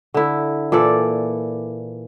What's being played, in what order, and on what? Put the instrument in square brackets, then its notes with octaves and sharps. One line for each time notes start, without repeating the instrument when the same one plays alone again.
[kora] D3 E4
A#2 E3 A4 D5